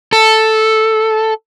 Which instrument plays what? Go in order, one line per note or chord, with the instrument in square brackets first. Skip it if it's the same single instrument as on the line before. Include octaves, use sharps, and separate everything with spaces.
[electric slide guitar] A4